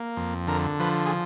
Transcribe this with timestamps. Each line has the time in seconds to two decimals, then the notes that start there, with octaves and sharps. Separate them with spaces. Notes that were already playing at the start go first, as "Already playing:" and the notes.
Already playing: A#3
0.17 F2
0.47 D3 A#4
0.80 F3 B4
1.06 G#4